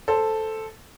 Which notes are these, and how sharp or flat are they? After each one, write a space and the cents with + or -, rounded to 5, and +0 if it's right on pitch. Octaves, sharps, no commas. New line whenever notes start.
A4 +0 C5 +0